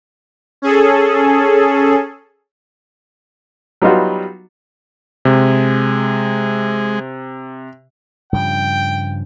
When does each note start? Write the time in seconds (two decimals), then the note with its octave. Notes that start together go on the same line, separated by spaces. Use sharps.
0.62 C#4 G#4 A4
3.82 F#3 G3 B3 D#4 F4 F#4
5.25 C3 G#3
8.33 G2 C#3 F3 G5